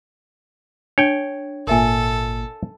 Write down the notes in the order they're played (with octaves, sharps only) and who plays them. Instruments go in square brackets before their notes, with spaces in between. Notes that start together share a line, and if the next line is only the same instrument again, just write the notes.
[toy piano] D4 [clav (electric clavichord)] C#5 G5
[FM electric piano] G#1 A#2 [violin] A4 [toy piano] A#4 E5 G#5